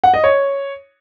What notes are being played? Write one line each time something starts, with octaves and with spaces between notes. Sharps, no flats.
F#5
D#5
C#5